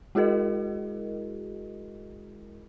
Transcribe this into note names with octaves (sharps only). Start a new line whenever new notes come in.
G#3 E4 F#4 G#4 A#4 D#5